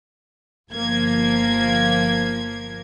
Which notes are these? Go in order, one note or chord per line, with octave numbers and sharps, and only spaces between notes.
G1 F3 A#3 G#6